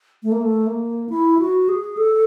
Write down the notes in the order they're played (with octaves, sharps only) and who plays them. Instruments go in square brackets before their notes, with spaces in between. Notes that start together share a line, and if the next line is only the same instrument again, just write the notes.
[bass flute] A3
A#3
A3
A#3
E4
F#4
G#4
A4